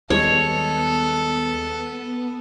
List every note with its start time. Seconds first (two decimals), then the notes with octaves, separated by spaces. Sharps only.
0.10 D#2 G3 G#3 B3 A4 C#5